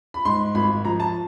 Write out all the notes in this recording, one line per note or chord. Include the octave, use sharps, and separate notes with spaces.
B5
G#2 C6
G#1 B5
F3 A#5
A5